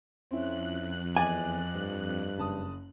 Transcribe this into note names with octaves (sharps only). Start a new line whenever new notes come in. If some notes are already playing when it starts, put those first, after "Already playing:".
F2 C4 C#4 E4 F#6
E2 D#5 G#5 D6 A6
G2
F#1 A5 D#6